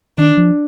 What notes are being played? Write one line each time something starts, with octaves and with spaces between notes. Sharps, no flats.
D#3 D4
F3